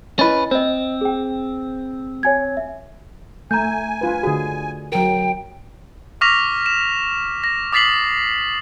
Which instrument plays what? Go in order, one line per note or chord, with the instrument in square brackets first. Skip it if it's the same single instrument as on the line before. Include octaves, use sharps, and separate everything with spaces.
[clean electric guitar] C#4 B4 [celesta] E4 D#5 A6
[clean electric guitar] C4 [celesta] C5 D#5
[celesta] G#4 G5
C#5 G#5 G#6
E5
[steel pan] A3 [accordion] G#5 [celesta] A#5 G6
[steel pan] D4 F4 B4
[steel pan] D3 G#4 [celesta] F#4
[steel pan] F#3 A#4 [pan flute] G5
[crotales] C#6 D6 F6 A#6 B6 F7
E7
A#6
D6 D#6 A6 B6 C7 F#7